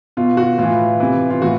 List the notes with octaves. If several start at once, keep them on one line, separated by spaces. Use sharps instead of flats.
B2 F4
F#4
A2 E3 F4
C3 E3
F4
A2 E3 F#4